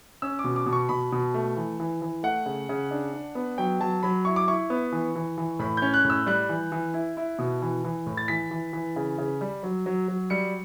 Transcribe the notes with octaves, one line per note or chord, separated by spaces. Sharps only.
C#4 E6
D6
B2
D6
B2
C#6
B2 B5
B2
A3
E3
E3
E3
A3 F#5
C#3
C#3
D4
D4
B3
F#3 G5
F#3 A5
F#3 B5
E4 C#6
D6
E4 C#6
B3
E3
E3
E3
A2 B5
C#4 G6
F#6
A2
E6
G3 F#6
E3
E3
E4
E4
B2
E3
E3
A2
A6
E3 B6
E3
E3
C#3
C#3
G3
F#3
F#3
F#3
G3 C#7